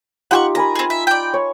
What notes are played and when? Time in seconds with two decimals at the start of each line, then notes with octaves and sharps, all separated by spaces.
0.31 D#4 F4 G4 F#5 G5 C#6
0.55 A#4 G#5 A#5 B5
0.75 C4 G#4
0.90 E5
1.07 D5 G5
1.34 C#5